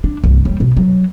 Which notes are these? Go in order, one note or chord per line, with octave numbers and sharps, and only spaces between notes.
D4
C2 G2
D#2 G3
B2
F#3